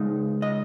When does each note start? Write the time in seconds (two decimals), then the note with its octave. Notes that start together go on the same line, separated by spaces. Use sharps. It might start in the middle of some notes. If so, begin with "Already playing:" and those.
Already playing: C#2 G#3 D#4
0.42 D#5